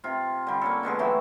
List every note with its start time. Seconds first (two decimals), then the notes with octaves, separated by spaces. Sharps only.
0.04 C3 F4
0.47 D3 G3
0.61 A#3 C#4 A4
0.83 B2 D3 G#3 G#4
0.99 E3 F#3 A3 G4